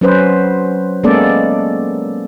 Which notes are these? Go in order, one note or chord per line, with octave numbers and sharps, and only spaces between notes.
F#3 C#4 B4 C5
G#3 A#3 B3 C#4 A4 D5